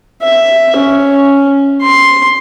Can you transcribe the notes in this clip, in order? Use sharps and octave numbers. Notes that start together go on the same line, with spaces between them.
E5
C#4
C6